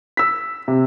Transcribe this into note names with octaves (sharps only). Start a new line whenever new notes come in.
E6 B6
C3